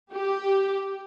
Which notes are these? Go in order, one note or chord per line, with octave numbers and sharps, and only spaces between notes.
G4